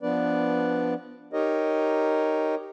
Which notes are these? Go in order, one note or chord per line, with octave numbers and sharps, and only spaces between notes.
F3 B3 D4 B4 D5
D#4 G4 A#4 C#5 D#5